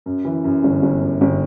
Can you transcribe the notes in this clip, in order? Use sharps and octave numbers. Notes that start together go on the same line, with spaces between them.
F#2
E3
F#2
G1
G1
F#2
G1